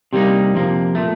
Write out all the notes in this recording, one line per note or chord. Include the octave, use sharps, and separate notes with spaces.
C3 G3 A#3 D#4
F2 C3 F3 A#3
A#2 A3